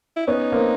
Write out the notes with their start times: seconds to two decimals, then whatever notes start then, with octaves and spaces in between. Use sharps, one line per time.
0.16 E4
0.27 B3 C#4 D#4
0.52 A#3 C4